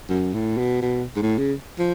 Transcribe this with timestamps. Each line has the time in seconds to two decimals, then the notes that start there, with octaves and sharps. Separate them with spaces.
0.09 F#2
0.34 A2
0.58 B2
0.82 B2
1.16 G#2
1.22 A2
1.39 C#3
1.79 F3